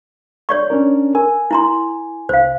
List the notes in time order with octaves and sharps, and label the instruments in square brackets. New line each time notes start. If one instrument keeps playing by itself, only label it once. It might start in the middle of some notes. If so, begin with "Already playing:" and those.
[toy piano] C#5 D5 C#6
[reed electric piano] C#4 D4 A#4
[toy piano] A#4 [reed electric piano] G#5
[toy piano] E4 A#5 C6
[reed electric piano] C2 [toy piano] C5 F5